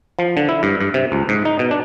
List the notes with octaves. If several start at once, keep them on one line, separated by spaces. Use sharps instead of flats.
F3
D3
E4
G2
G2
C3
C#2
G#2
D#4
B2
D4